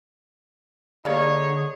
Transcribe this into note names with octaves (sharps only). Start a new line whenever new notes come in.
D3 G3 A#3 D#4 G#4 C#5